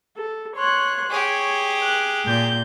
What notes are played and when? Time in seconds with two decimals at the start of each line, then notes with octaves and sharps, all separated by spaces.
0.16 A4
0.56 C#5 C6 F#6
1.10 G4 G#4 C#5
1.84 F#6
2.25 A#2 G6